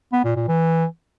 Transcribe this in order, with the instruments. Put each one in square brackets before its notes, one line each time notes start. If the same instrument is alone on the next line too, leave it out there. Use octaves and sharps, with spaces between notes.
[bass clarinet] B3
A#2
A#2
E3